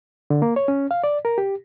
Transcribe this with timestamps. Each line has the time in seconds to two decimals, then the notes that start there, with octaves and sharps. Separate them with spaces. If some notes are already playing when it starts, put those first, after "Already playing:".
0.30 D3
0.42 A#3
0.56 C#5
0.68 C#4
0.91 F5
1.04 D5
1.25 A#4
1.38 G4